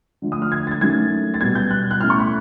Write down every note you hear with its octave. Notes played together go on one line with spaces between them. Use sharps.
D3 F3 A3
D#6
F6
G#6
A6
G#6
D#3 F#3 A3 C#4 G#6
A6
B2 G3 B3 G#6
G6
F#6
F#6
A2 E3 A3 C#4 F6
C#6
B5